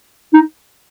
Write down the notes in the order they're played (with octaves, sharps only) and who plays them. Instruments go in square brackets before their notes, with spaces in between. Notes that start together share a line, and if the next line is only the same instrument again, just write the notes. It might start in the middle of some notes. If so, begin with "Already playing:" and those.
[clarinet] D#4